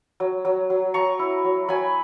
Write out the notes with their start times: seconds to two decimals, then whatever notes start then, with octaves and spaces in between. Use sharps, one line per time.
0.20 F#3
0.45 F#3
0.70 F#3
0.94 F#3 A#5 C#6
1.19 E4
1.44 F#3
1.69 F#3 G#5 B5